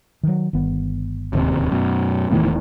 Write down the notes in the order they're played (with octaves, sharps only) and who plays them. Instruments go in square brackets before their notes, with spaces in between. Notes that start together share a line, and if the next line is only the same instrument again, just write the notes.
[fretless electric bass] D#3 F#3
G1 D#3 B3
[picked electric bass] D1 D#2 C3
F#2 B2
[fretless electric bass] E1 A3 B3 [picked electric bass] A2 D#3 E3